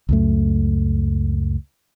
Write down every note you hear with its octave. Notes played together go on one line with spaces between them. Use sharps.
C#2 F#2 A3